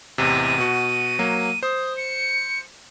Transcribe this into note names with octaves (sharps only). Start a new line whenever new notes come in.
A1 E2 C3 D#7
B2 F#4
F#3 A#3
C5 D#6
C#7